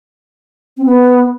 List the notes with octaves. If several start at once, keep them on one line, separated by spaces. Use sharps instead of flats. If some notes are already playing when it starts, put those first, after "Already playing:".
C4
B3